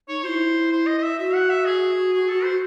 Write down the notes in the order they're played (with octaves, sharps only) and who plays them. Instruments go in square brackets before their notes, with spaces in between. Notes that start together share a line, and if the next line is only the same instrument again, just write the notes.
[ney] D#4 [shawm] C#5
[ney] E4 F#4 [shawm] C5
[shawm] C5
D#5
D#5
E5
[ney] F#4 [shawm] E5
[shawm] F#5
E5
G#4
G#4
A4
C5